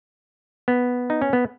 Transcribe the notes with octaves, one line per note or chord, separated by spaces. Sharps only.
B3
D#4
C#4
B3